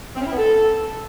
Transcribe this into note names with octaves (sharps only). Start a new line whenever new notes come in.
C4
C#4
E4
B3
A4